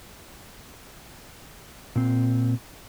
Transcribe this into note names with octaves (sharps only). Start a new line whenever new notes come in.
A#2 C4